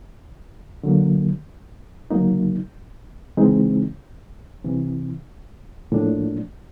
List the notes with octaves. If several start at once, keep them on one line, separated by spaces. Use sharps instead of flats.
D3 F#3 A#3
D2 C#3 F#3 A#3 D#4
C#3 E3 G#3 C4 D#4
C2 C3 E3
A2 F3 A#3 D4